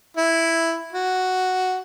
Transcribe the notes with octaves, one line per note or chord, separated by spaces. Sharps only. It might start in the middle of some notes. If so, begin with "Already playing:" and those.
E4
F#4